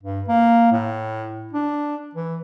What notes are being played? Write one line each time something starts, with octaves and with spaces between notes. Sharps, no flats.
G2
A#3
A2
D4
E3